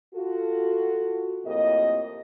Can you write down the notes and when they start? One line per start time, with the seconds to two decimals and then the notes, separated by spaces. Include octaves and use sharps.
0.15 F4 F#4 A4
1.45 F2 A2 A#3 G4 D#5